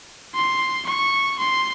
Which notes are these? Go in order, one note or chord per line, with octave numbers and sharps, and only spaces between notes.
C6
C#6
C6